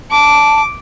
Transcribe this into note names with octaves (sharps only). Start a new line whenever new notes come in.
A5 D6